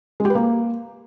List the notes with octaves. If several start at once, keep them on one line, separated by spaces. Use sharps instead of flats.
G#3
G4
B4
A#3